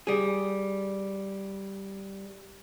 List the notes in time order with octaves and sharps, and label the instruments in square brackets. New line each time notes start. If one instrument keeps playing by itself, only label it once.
[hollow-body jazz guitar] G3 G#4